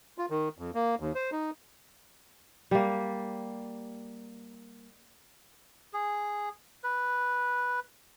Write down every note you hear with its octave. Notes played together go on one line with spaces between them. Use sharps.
F4
D#3
F2
A#3
D#2
C5
D#4
G3 A#3
G#4
B4